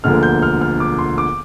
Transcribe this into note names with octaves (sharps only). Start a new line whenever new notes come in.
E1 D2 D3 F3 A#3 F6
G6
F6
F6
D6
C6
D6